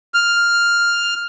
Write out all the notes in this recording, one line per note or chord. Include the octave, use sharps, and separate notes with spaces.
F6